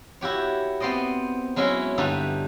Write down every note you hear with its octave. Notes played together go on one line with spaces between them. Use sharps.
E4 F#4 G4 C#5
B3 C4 C5 D5 D#5
F#3 G#3 C#4 E4 F#4
G2 D3 G3 D#4 E4 B4